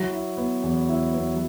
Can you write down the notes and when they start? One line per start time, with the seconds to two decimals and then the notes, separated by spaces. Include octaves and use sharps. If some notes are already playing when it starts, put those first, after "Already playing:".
Already playing: F#3 E4
0.13 E4
0.37 B3
0.63 E2
0.89 E4
1.14 B3